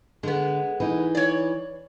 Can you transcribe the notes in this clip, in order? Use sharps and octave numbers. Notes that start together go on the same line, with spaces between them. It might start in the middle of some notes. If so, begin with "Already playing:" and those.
D3 G#3 B3
E3 D#4
C#5 D5